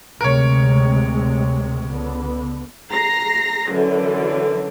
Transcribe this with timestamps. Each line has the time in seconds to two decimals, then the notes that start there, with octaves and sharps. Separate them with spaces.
0.21 D2 C3 G#3 A#4 C#5
1.89 C#2 D3 B3
2.91 A#5 A#6 C7
3.71 F#2 D3 E3